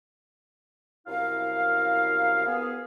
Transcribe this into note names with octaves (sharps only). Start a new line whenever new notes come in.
C2 F#2 E4 A#4 F5
B3 G#4